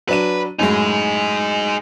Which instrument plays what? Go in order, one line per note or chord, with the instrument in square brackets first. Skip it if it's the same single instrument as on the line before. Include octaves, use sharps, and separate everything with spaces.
[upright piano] F#3 D4 D#7 [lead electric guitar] B4
[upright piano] F#2 A2 G#3 [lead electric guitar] D#4 G#4